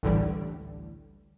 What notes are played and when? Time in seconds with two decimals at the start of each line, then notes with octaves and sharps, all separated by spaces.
0.03 A1 D2 A2 D3 E3 G3